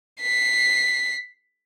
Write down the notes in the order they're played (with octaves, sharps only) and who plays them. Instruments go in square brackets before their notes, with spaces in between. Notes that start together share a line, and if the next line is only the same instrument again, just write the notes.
[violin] B6 C7